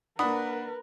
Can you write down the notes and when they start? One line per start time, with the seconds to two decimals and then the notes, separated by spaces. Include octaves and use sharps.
0.19 A#3 D4 A#4 B4 F#5 B5 D#6